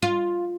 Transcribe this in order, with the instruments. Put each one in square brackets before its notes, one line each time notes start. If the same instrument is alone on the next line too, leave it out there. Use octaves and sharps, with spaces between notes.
[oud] F4